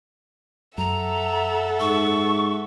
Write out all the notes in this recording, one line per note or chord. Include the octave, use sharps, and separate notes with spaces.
F#2 A4 E5 F#5 A#5
G#2 C#6